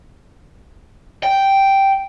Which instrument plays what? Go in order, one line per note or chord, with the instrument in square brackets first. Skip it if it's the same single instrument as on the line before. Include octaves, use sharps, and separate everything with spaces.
[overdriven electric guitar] G5